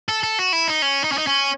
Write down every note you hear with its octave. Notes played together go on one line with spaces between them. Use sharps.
A4
A4
F#4
E4
D#4
C#4
D#4
C#4
D#4
C#4